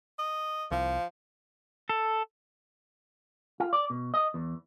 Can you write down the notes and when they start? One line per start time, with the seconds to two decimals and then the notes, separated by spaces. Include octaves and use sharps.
0.19 D#5
0.71 C2 F3
1.89 A4
3.60 F4
3.73 D5
3.90 B2
4.14 D#5
4.34 E2